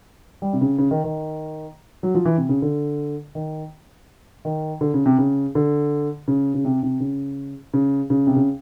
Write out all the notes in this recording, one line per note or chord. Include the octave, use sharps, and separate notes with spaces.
G3
C3
C#3
C#3
D#3
D#3
F#3
F3
E3
C3
C#3
D3
D#3
D#3
D3
C#3
C3
C#3
D3
C#3
C#3
C3
C3
C#3
C#3
C#3
C3
C#3